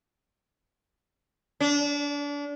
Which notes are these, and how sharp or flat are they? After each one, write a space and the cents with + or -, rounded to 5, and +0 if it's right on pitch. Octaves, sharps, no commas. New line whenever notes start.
D4 -30